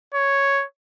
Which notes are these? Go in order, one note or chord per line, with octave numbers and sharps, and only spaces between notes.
C#5